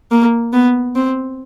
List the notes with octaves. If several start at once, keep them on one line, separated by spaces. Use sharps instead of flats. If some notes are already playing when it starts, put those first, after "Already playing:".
A#3
B3
C4